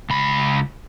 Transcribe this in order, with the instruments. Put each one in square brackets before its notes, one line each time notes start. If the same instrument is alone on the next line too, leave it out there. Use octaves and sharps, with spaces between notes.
[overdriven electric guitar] C#2 B5